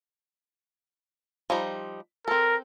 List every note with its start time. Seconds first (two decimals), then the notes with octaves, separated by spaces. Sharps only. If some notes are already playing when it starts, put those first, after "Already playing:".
1.50 F3 G3 D#4
2.28 C4 A4 A#4